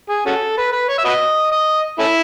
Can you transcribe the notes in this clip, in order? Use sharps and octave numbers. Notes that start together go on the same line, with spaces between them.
G#4
C#4 F#4 A4
B4
B4
C#5
E5
F#4 B4 D#5
D#5
A3 C#4 E4